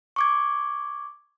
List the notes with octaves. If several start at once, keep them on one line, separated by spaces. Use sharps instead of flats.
C#6 D6 G#6